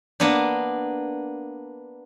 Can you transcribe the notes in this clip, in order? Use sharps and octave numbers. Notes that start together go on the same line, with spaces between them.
A#3 B3 D4